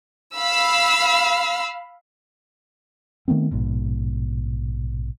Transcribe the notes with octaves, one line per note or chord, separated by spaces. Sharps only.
F5 B5 E6
D#3 A3 B3 C4
A#1 G#2 B2